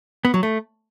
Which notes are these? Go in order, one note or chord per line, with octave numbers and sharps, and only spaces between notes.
B3
F#3
A3